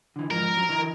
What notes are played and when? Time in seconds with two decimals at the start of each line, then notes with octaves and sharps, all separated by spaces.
0.16 D3 E3
0.31 F2 G#2 F3 A#4
0.53 F2 F#3
0.69 D#3 E3